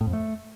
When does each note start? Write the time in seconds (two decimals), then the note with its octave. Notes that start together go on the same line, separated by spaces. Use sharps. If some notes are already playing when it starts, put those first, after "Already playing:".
0.01 A2
0.07 F2
0.13 A3